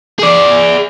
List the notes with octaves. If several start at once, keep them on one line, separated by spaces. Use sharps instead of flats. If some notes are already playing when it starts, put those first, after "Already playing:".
G#4 D5